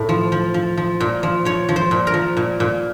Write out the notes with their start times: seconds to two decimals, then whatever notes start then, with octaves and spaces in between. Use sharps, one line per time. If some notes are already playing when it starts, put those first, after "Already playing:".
Already playing: A2 A4
0.09 F3
0.32 F3
0.54 F3
0.77 F3
1.00 A#2
1.23 F3
1.45 F3 C#5
1.69 F3
1.76 C5
1.91 A#2
2.07 A#4
2.14 F3
2.37 A#2
2.60 A#2